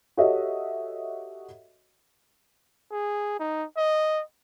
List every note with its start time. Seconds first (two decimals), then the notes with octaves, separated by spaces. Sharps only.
0.17 F#4 G4 A4 C#5 D#5 E5
2.92 G#4
3.40 D#4
3.77 D#5